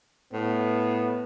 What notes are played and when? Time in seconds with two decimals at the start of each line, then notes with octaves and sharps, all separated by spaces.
0.33 A2 B3